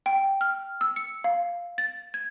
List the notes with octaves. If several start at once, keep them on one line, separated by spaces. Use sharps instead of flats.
G5
F6
E6
C#7
F5
A6
G#6